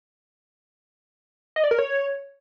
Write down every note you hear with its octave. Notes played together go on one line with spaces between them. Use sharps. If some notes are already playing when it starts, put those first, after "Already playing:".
D#5
D5
A#4
C#5